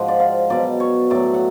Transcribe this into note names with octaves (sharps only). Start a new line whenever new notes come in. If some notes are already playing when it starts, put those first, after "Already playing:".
Already playing: G#2 F3 F#5
D5
F5
B2 F#3 D5
C#5
A2 F#3 D5
F#5